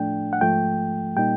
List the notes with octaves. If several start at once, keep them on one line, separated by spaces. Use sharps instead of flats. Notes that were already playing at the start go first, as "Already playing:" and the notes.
Already playing: A2 F3 A3 D4 G5
F#5
G#2 F3 A3 G5
A#2 G3 A#3 D#4 G5